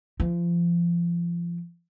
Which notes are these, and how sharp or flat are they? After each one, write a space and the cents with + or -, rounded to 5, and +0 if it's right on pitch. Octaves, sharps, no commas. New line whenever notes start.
F3 -30